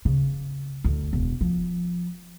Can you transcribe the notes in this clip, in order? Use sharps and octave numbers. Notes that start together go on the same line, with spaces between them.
C#3
D2
E1
F3